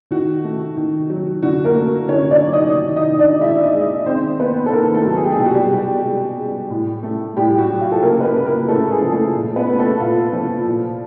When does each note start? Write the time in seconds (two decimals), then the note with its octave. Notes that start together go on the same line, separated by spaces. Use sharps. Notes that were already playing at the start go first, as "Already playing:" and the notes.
0.11 D#3 F#4
0.44 A3
0.77 D#3
1.10 F#3
1.42 D3 F#4
1.64 A#3 A#4
1.75 A3
2.08 D3 C#4 C#5
2.31 D4 D5
2.42 F#3
2.53 D#4 D#5
2.74 D#3
2.96 D#4 D#5
3.07 D#3
3.19 D4 D5
3.40 G#3 E4 E5
3.63 D#4 D#5
3.74 G#3
4.06 D#3 C4 C5
4.39 A#3 B3 B4
4.66 A4
4.72 D#3 A#3 A#4
4.94 A3 A4
5.05 F#3
5.16 G#4
5.24 G4
5.30 G#3 G#4
5.39 B2 G4
5.46 F#4
5.54 G3 G4
5.71 B2
6.04 G#3
6.38 G#3
6.70 A2
7.03 A3
7.37 A2 G3 G4
7.58 F#4
7.70 F#3
7.81 F4
7.92 A4
8.02 C#3 A#3 A#4
8.20 B4
8.24 A#3 A#4
8.35 A#3
8.46 A#3 A#4
8.68 C#3 A3 A4
8.91 G#3 G#4
9.01 F3
9.12 A3 A4
9.35 A#2
9.56 B3 B4
9.68 A3
9.79 A3 A4
10.00 A#2 F4
10.33 F3
10.66 A#2